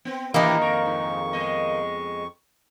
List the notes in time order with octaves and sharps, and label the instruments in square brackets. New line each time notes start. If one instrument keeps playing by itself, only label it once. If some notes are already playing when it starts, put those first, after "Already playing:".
[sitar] B3 C4
[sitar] A2 E3 D4 [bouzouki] D#3 A#3 [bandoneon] E4 G4 D#5
[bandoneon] F2 C#6 [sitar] A#4
[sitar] G#2
G#3 B3 D#5